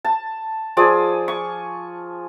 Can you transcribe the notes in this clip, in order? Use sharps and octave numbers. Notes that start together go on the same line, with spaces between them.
A5
F3 G#4 D5 G#5
C#6